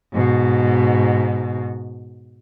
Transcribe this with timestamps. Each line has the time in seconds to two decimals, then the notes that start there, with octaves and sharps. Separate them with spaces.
0.13 G#2 B2